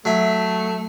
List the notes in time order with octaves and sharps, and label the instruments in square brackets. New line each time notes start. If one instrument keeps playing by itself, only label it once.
[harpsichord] F#3 E5 [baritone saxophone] A3